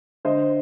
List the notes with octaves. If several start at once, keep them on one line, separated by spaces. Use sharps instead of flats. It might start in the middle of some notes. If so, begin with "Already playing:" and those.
D3 C5 D#5